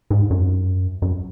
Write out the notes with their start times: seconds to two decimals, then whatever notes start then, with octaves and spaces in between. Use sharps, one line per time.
0.10 G#2
0.31 F#2
1.02 F#2